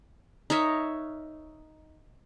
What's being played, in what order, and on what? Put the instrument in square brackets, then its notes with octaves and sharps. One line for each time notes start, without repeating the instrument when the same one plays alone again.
[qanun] D#4 A#4 C#5 E5